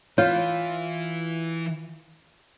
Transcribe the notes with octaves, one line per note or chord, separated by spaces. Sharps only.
E3 F4 C#5